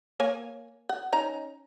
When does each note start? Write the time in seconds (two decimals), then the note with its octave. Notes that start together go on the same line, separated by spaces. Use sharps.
0.20 A#3 C#5 G#5
0.89 F#5
1.12 C#4 D#4 A#5